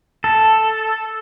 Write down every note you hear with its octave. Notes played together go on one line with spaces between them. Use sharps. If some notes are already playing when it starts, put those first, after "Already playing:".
A4